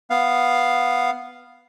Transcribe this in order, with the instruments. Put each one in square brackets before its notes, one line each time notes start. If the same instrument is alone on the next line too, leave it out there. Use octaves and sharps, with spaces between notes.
[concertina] B3 F5